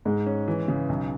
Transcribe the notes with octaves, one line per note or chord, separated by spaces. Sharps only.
G#2 G#3
C#4
E3
C#3
B1